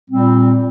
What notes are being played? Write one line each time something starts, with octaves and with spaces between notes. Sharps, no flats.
A#2 G3 C4